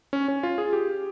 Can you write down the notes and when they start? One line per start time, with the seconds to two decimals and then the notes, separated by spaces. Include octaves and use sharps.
0.13 C#4
0.28 C#4
0.43 F4
0.58 G#4
0.73 G4